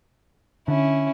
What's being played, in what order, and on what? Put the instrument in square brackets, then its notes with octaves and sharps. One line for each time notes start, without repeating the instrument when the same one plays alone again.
[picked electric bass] D3 [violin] C#4 E4